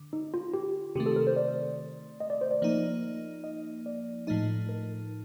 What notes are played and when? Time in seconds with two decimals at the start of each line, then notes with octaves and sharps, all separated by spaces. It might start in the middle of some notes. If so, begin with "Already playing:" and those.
Already playing: D3
0.13 D#4
0.34 F4
0.54 G4
0.95 C3 D#3 A3 G4
1.06 A4
1.16 A#4
1.27 C5
1.36 D5
2.20 D#5
2.30 D5
2.41 C5
2.51 D5
2.62 F3 A#3 D#4
3.44 D#5
3.86 D5
4.27 A2 F3 A3 D#4
4.69 A#4